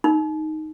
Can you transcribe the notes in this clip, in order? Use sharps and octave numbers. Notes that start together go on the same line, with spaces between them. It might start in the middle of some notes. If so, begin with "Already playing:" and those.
D#4